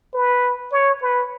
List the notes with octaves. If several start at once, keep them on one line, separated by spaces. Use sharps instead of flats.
B4
C#5
B4